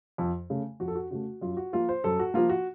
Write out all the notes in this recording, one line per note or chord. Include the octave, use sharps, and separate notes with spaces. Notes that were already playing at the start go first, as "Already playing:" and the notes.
F2
C#3 A3
F2 F#4
A4
F#4
C#3 A3 F#4
F#2 F4
F#4
F3 A#3 F4
C5
F#2 A4
F#4
F3 A#3 F4
F#4